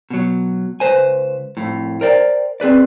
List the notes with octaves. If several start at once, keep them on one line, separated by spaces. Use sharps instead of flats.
B2 F#3
C#2 B4 C5 G#5
F2 A2
A#4 C5 D5 G5
C4 G#4 B4 D5